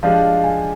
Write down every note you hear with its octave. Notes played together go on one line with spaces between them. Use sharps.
F3 G#3 D4 G4 F5
G#5